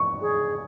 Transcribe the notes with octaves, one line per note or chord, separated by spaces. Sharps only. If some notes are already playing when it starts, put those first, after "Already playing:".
Already playing: C#6
G#4